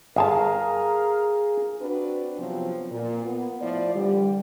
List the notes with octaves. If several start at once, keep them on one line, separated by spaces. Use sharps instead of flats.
G1 G#4 A#4 F5 G#5 A5
C4 D4 F#4 B4
C3 F3 F#3 B3 C4
A#2
B3
A2 F3 E4 D5
D3 E3 G3